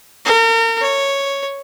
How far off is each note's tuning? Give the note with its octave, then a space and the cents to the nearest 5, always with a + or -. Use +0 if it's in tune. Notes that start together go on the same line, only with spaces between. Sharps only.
A#4 -35
C#5 +0